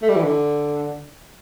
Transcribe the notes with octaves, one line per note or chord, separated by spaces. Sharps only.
A3
G3
E3
D3